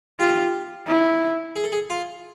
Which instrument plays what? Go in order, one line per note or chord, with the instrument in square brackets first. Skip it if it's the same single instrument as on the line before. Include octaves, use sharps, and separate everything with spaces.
[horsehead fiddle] F4 [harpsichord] G4
[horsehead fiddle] E4
[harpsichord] G#4
A4
G#4
F4